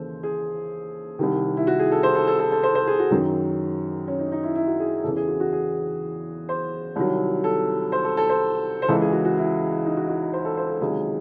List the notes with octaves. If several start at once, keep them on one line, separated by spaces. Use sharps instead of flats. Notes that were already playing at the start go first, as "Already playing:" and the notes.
Already playing: D#2 C#3 E3 A4 C5
G#4
C2 C3 D#3
E4
F#4
G#4
A4
C5
A4
A4
A4
A4
C5
C5
G#4
F#4
F#2 D#3 F#3
C#4
D#4
D#4
E4
E4
F#4
G#4
E2 C#3 E3 A4
G#4
F#4
F#4
G#4
C5
C2 C3 D#3 F#3
A4
C5
A4
A4
C5
C5
C#2 C#3 E3 A4
G#4
F#4
F#4
E4
D#4
F#4
F#4
C5
A4
C5
A4
C#2 C3 D#3 F#3 G#4